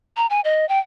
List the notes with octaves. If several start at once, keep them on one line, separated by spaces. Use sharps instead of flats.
A#5
G#5
D#5
G5